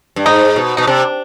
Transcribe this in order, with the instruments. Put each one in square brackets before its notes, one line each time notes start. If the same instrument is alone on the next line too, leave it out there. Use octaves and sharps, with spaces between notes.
[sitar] G2
[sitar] G#2 [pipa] D#4
[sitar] B2
[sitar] B2 [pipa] D#4
[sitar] C3 [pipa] D4